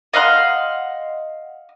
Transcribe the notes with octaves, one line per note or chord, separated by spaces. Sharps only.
D#5 F5 F#5 C6